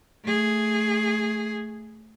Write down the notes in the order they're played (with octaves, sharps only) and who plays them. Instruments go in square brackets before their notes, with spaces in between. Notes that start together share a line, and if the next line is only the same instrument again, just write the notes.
[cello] A3 G#4